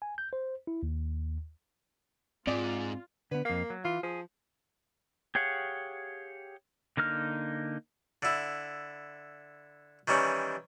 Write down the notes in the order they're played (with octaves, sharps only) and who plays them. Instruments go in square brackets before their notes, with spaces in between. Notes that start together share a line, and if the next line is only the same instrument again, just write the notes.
[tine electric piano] G#5
G6
C5
E4
D#2
[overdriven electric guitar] G#2 [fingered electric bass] C4 [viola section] F4 [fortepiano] D5
[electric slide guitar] D3 B3 [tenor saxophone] B4
[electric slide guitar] F2 F5 [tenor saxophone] A#3
[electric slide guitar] F#3
[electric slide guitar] E3 [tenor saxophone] F4
[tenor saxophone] F3 [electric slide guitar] G#4
[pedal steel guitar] G4 G#4 C#5 F5 F#5
D3 A#3 D#4 F6
[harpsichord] D3 E4
D#3 E3 G3 C#4